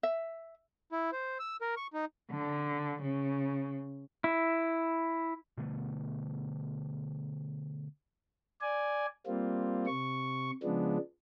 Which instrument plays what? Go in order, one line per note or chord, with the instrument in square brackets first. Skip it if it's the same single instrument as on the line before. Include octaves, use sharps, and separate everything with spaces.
[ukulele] E5
[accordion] E4
C5
E6
A#4
C#6
D#4
[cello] D3
C#3
[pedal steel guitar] E4
[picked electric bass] B2 D3 A3 B3
[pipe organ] D5 G#5
G3 A#3 C4 F4
C3 C#6
C#3 F3 G#3 B3 D4